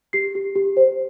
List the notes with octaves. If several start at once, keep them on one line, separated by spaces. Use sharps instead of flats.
G4 C7
G4
G4
C5